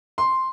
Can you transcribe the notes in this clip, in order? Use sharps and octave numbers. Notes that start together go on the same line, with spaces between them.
C6